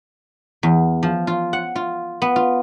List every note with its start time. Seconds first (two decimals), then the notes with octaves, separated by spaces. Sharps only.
0.63 E2
1.03 F3
1.27 F4
1.53 F#5
1.76 F4
2.22 B3
2.36 F4